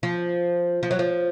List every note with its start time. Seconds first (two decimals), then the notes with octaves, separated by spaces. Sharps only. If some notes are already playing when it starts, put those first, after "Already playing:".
0.03 F3
0.83 F3
0.91 F#3
0.99 F3